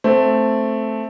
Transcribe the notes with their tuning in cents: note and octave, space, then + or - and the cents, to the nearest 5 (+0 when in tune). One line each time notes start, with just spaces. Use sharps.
A3 +0 C4 +0